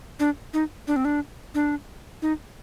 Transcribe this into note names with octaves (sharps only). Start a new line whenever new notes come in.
D4
D#4
D4
C4
D4
D4
D#4